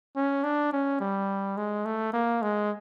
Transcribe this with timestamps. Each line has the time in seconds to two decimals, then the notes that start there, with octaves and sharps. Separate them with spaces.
0.16 C#4
0.44 D4
0.73 C#4
1.00 G3
1.57 G#3
1.85 A3
2.13 A#3
2.42 G#3